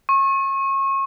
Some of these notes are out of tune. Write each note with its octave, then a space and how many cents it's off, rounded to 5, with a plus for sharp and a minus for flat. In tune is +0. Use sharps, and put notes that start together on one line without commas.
C#6 -30